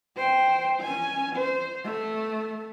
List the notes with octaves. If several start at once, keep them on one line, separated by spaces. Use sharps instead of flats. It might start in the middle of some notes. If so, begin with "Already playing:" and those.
C5 G5
C#4 G#5
C5
A3